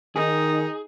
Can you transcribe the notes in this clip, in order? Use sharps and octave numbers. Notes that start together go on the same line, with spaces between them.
D#3 D#4 G#4